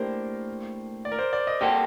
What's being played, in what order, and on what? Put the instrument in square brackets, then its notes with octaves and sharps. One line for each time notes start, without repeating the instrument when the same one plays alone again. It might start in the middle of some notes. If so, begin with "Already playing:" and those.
Already playing: [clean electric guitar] A2 A#3 D4 G4 [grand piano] A#4 C5
[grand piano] D5
A#4
C5
D5
D#5
[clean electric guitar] C3 G3 A#3 F#4 A4 [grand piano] G4